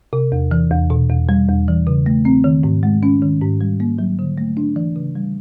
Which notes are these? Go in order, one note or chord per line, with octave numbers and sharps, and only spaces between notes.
C3
E2
E3
E2
B2
E2
G3
E2
E3
C#3
A3
C4
D#3
G#2
G#3
C#4
D#3
G#2
G3
A#3
F#3
D3
A3
D4
E3
C#3
G3